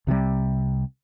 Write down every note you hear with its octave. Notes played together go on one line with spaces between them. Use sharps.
C2 C3 D#3 G3